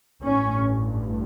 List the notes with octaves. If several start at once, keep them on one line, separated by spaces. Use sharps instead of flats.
A1 G2 C#4